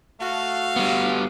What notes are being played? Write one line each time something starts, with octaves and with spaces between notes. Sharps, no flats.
A3 F#4 F5
G3 B3